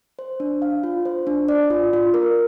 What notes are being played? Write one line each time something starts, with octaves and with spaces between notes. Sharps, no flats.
C5
D4
F5
F4
C5
D4
D5
F4
F4
A#4